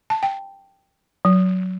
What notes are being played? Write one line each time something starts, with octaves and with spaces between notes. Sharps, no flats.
A5
G5
F#3